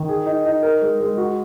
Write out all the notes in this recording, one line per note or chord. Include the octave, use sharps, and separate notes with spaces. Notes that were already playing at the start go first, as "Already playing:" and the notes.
Already playing: D#3
G#4
D#4
D#4
A#4
G#3
G#3
F#4